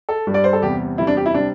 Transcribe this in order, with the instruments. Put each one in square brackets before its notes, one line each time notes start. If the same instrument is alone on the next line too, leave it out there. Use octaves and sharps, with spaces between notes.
[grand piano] A4
G2 G3
D5
C5
A4
E2 C3 G3 G4
E2 C3 G3 E4
D4
G4
E4
C3 G3 D4